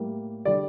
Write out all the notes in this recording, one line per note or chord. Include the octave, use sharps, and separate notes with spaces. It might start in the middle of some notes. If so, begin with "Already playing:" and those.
Already playing: A2 G3 A#3
D3 G3 D5